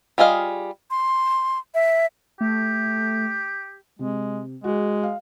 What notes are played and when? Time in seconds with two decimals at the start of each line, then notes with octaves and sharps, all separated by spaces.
0.18 G3 F4 G#4 D#5 F5
0.90 C6
1.74 E5
2.41 A3 G4
3.99 C3 G#3
4.64 G#3 F#4 G#4
5.03 F5